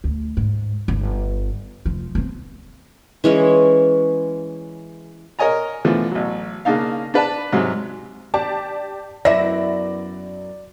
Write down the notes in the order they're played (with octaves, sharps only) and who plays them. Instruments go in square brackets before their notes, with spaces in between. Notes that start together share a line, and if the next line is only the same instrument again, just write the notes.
[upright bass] D2
G#2
G1
F1 F3
B3 C4
[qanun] E3 G#3 C#4
[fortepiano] A#4 C#5 D#5 G#5 A#5
D3 E3 F3 A3 B3
A1 F#3
C#3 A#3 D4 D#4 F5
D4 B4 D5 A5
G#2 C3 F#3 G#3
[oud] D4 [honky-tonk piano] G4 D5 A5
[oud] F#2 B3 E4 [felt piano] D5 [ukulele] E5 [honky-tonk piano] A#6